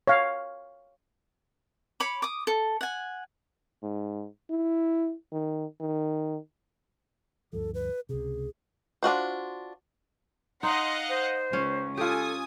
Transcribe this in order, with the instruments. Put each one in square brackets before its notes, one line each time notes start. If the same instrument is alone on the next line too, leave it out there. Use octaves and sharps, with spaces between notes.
[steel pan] C#5 F5
[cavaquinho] C#5 B5 D6
D6 D#6
A4
F#5 G#5
[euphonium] G#2
E4
D#3
D#3
[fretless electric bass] D2 G2 F3 [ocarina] A4
[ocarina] B4
[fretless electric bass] C#2 C3 [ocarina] G#4
[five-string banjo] D4 F4 F#4 C5
[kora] D#4 [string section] D#5 F5 F#5 [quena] C6
[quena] C5
[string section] C#2 [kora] C#4
[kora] F4 G4 [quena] A4 [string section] G#5 D#6